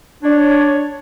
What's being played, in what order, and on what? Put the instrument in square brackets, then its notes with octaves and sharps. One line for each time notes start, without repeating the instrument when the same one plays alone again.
[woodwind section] D4 C#5